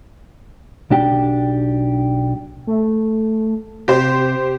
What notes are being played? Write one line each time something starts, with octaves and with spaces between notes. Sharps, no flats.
B1 D4 G4
A3
C3 G4 C5